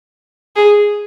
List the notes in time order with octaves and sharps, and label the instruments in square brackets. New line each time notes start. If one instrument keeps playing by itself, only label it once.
[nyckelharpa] G#4